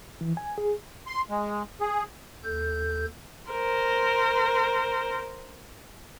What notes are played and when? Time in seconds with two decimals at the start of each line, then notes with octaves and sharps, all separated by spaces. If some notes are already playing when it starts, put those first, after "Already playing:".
0.21 E3
0.37 G#5
0.58 G#4
1.07 C6
1.30 G#3
1.81 G#4
2.43 D#2 A4 G6
3.50 A#4 C5